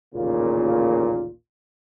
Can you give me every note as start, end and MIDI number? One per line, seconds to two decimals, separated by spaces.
0.15 1.29 33
0.15 1.29 39
0.15 1.29 46
0.15 1.29 49
0.15 1.29 58
0.15 1.29 65